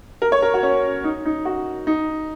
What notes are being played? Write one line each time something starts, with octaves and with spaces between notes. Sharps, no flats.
A#4
C#5
A#4
F#4
C#4
D#4
D#4
F#4
D#4